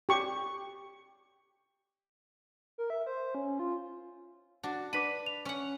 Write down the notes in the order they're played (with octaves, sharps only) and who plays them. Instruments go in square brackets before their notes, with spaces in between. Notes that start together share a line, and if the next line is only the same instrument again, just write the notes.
[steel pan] G4 C#6
[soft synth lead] A#4
E5
C5
C#4
F4
[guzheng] D4 [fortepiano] F#4
[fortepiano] D4 B4 [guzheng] B5 [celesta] D6 B6 D#7
[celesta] F7
[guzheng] C#4 F#5